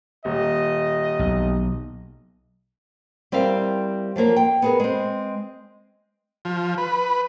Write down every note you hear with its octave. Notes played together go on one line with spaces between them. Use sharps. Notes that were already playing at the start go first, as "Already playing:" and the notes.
D#1 D#5
B1
G3 C4 E4 A#4 F5
F3 F#3 A#3 A#4
G5
B3 G#4 A#4
G#3 C4
F3
B4